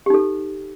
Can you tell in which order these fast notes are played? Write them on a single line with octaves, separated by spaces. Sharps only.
G4 D#4 A4